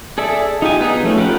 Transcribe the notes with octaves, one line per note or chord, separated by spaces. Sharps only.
G#4 A4 D5 E5
D#4 F4 G4 G#5
B3 D#4 G#4
F3 A3 C#4
F4 G4 A#4 F#5 B5